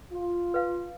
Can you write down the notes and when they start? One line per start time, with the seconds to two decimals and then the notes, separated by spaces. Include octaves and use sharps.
0.12 F4
0.54 B4 F5